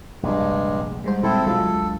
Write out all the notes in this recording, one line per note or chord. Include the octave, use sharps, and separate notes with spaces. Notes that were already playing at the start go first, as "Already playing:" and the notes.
F1 A#1 G2 G#3
G#2 G3 G#3 C5
A#2 C4 E4 A4
B1 D3 F#3 G#3 F4 A4
D2